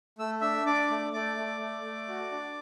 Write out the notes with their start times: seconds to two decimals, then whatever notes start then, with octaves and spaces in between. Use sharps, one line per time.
0.19 A3 E6
0.41 D4 E5 E6
0.66 D4 D5 D6
0.90 A3
1.13 A3 D5 D6
1.37 A3
1.60 A3
1.84 A3
2.08 F#4
2.31 D4